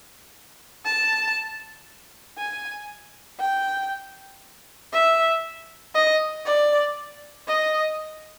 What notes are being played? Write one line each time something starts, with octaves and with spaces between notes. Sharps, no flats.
A5
G#5
G5
E5
D#5
D5
D#5